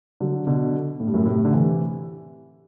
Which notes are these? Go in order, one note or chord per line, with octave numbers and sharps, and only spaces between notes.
D3 F#3
B2 D3
A2
G2
F#2 A2
A2 C3
C3
D3
C3 E3